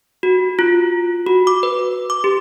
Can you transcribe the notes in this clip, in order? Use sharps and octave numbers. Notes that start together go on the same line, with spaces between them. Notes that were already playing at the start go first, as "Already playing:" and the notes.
F#4
F4
F#4
D6
B4
D6
G4